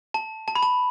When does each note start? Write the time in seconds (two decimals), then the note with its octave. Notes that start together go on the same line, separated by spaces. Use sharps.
0.14 A5
0.48 A5
0.55 B5
0.63 A5